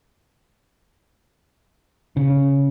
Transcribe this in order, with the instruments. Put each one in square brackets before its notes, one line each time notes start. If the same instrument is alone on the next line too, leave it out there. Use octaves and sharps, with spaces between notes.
[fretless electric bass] C#3